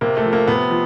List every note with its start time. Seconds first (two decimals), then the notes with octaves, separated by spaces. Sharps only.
0.01 C3 A#3
0.17 A3
0.25 F3
0.33 A#3
0.47 C3 B3
0.71 F3